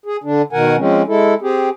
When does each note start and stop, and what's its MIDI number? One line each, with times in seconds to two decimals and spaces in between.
0.06 0.17 68
0.24 0.42 50
0.24 0.42 62
0.53 0.76 47
0.53 0.76 51
0.53 0.76 70
0.53 0.76 78
0.53 0.76 80
0.78 1.02 53
0.78 1.02 56
0.78 1.02 60
0.78 1.02 61
1.07 1.34 56
1.07 1.34 64
1.07 1.34 69
1.42 1.69 60
1.42 1.69 67
1.42 1.69 68